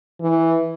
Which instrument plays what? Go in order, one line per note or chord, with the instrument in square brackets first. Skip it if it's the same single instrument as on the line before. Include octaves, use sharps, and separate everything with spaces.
[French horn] E3